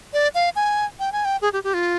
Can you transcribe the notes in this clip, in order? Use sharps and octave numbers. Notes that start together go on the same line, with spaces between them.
D5
F5
G#5
G5
G#5
G5
G#4
G4
G4
F4